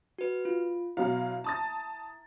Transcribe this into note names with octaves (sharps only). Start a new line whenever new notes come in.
F#4 B4
F4
B2 F#3 E4 F5
A5 D#6 A6